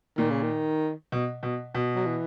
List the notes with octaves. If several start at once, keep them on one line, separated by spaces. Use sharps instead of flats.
A#2 D#3
C#3
D#3
B2
B2
B2
F#3
E3